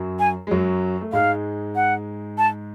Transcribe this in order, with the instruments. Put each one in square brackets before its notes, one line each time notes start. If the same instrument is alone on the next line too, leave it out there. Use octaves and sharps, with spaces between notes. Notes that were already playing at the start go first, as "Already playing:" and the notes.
Already playing: [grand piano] F#2 F#3
[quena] G#5
[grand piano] G#3
F#2 F#3
A3
[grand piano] G#2 G#3 [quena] F5
[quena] F#5
A5